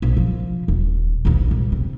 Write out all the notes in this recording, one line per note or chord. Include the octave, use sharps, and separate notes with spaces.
A#1 C3
F3
D#1
A#1 D#2
C2
C3